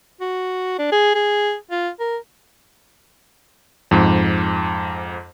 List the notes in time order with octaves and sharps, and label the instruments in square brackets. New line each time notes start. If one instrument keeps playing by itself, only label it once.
[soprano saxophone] F#4
D4
G#4
G#4
F4
A#4
[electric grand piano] F2 G#2